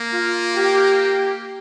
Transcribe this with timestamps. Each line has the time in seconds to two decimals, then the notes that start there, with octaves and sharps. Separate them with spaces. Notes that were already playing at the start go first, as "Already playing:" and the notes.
Already playing: A#3
0.13 F4
0.57 G4